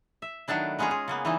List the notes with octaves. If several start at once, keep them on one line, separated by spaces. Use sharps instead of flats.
E5
D#3 F#3 A3 B3 D4 E4
G#3 B3 C#4 F4 G#4 A#5
G#4
C#3 A#3 B3
E3 G3 D#4 E4